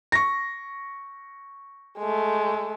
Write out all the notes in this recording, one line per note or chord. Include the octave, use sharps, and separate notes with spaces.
C#6 A#6
G#3 A3